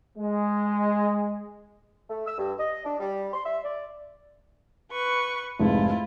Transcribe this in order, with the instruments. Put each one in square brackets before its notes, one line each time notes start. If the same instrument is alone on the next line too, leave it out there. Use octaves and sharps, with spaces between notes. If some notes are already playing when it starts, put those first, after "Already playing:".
[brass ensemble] G#3
[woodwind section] A3
E6
G2
D#5
D4
G3
C6
E5
D5
[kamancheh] B4 C#6
[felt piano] F1 G#2 [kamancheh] E4 F4